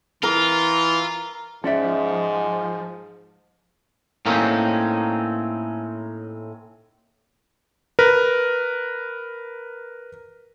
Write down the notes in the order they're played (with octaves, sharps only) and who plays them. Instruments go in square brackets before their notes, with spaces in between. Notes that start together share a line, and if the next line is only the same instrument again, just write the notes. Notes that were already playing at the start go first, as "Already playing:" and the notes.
[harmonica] E3 [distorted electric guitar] F4 [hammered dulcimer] A#4
[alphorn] G#2 [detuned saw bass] F3 [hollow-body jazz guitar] C#4 D5 E5
[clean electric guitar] A2 A#3 C4 C#4 D#4
[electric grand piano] A#4 B4